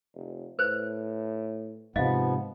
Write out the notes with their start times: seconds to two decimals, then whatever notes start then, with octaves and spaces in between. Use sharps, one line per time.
0.14 F1
0.59 A2 B4 C5
1.96 G#2 C3 F3 B3 D#5 F5